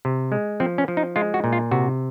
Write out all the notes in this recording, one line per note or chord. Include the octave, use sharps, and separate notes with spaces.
C3
G#3
F3 C4
C#4
F3
D#4
G#3 F4
F#4
A#2
F4
C3 F#4